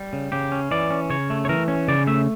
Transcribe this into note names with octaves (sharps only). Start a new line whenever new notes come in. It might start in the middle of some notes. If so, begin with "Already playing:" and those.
Already playing: G3
C#3
C#3 G4
C#4
E3 D5
C#4
C#3 C#5
A3
C#5
E3 A#4
C#4
C#3 D5
A3 E5